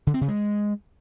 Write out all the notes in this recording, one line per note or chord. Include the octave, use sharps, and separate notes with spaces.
D3
C4
C#3
G#3